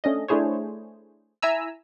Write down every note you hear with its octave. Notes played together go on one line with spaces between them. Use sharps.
A3 C#4 D4 D#5
A3 D4 E4 G#4 C5 C#5
E4 E5 G#5 A#5 E6